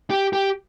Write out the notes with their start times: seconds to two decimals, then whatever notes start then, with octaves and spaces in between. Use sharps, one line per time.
0.10 G4
0.33 G4